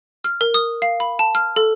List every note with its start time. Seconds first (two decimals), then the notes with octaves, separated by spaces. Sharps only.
0.24 F6
0.41 A#4
0.54 D#6
0.82 F5
1.00 B5
1.19 A5
1.35 F6
1.56 A4